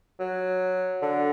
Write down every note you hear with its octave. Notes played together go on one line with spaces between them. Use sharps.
F#3
D3